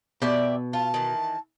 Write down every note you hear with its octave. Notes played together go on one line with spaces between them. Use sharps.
B2 G4 D5 E5
F4 A5
D#3 E3